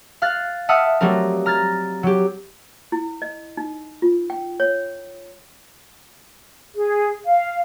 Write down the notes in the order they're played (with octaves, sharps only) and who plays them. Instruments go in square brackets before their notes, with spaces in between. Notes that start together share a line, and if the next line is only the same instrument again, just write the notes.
[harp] F5 F6 F#6 A6
E5 F#5 A5 D#6 F6
F#3 G3 A3 C4 A#4
A#5 F6 G#6 A6
F#3 G4
[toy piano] E4
D#5
D#4
F4
G5
C#5
[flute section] G#4
F5